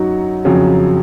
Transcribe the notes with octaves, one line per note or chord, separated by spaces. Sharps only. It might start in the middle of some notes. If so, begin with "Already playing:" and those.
Already playing: F#2 F#3 D#4 F#4
F2 C#3 F#3